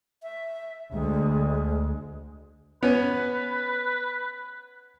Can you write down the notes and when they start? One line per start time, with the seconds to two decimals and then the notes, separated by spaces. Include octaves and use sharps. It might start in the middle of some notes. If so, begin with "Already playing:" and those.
0.23 E5
0.92 D2 G#3
2.83 B3 C#4 B4